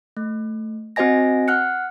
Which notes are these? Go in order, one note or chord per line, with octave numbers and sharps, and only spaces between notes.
A3
C4 F#4 C5 D#5 G#5 A#6
F#5 F6 F#6 C#7